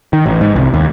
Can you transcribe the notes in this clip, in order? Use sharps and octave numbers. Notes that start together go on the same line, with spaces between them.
D#3
A1
G#2
C2
D#2